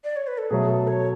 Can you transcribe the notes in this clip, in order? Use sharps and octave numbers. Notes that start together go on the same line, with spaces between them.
D5
C#5
B4
A4
B2 F#3 A3 G#4
A4
C#5